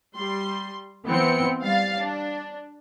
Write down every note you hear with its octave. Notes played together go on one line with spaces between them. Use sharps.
G3 C6
E3 B3 C4 G5 C#7
G3 F5 A6
D4